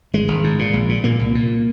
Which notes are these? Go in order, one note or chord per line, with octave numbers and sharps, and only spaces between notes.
G#1 G#3
G#1
G#2
A#2
A#1
A#2
A#2 A#3
C2
A#2